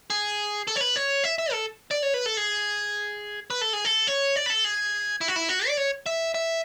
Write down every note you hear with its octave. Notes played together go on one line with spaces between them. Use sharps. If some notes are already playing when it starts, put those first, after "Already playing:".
G#4
A4
C#5
B4
C#5
E5
E5
A4
D5
C#5
B4
A4
G#4
B4
A4
G#4
A4
C#5
D5
B4
A4
G#4
E4
F#4
E4
F#4
D5
C#5
E5
E5